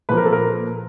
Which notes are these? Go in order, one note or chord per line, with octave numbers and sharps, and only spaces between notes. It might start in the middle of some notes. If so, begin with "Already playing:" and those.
A#2 F3 A#3 B4
A#4
A4
A#4